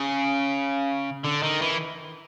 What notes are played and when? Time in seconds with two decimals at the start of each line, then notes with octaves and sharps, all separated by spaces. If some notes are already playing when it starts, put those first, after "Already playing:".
Already playing: C#3
1.24 D3
1.42 D#3
1.62 E3